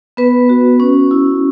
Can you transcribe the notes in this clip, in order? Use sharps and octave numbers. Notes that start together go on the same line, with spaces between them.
B3 B4
F#4
C#4
E4